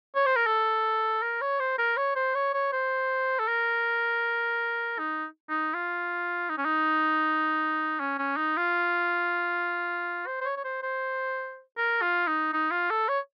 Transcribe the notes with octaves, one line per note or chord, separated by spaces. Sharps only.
C#5
C5
A#4
A4
A#4
C#5
C5
A#4
C#5
C5
C#5
C#5
C5
A4
A#4
D#4
D#4
F4
D#4
C#4
D#4
C#4
C#4
D#4
F4
C5
C5
C#5
C#5
C5
C5
A#4
F4
D#4
D#4
F4
A4
C#5